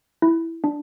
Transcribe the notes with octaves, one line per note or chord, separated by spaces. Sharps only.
E4
D4